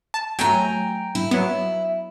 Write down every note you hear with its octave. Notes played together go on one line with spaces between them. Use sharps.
A5
F#3 A3 G5 G#5 A#5
E4
F#3 B3 E4